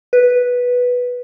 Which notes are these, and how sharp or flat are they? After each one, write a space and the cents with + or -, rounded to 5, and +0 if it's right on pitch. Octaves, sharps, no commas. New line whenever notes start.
B4 -5